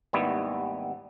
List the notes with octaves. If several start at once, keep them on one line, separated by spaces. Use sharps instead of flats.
G#1 D#2 G3 B3 E4